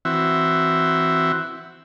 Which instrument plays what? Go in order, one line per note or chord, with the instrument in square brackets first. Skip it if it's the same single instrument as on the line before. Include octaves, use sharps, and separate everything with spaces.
[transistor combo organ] E3 C4 F#4 E5